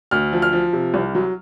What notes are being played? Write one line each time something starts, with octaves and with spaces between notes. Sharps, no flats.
D2 F6
F3
F6
F3
C3
C2
F#3